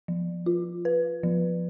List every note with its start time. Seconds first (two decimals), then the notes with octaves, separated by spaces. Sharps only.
0.08 F3
0.46 F4
0.85 B4
1.23 F3